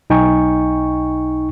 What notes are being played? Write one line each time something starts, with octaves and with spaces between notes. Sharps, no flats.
B1 D#4 G5 G#5 C#6